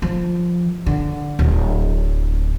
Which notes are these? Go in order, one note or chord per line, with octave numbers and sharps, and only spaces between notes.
F3
D3
D1